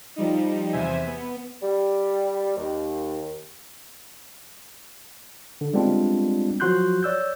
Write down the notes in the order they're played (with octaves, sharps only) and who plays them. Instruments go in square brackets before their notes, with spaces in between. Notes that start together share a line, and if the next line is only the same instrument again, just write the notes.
[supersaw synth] F3 G3 D#4
E2 C3 C5 E5 G#5 D#7
B3
[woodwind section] G3
D#2
[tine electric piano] D3
G3 G#3 B3 C4 D4 F4
F3 F#3 F#4 C6 F#6 G6
C#5 D5 E6 G6